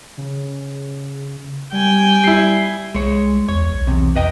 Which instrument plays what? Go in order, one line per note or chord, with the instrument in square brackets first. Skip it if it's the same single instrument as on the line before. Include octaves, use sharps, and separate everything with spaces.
[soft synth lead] C#3
[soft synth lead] G3 [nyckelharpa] G5 G#5
[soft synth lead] G3 [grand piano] E4 C7
[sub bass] C2 [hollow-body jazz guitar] G#3 C#5
[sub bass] E2 [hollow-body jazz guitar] C#5
[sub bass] B1
[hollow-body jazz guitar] E2 C3
[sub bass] F2 [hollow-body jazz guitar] B4 D#5 G5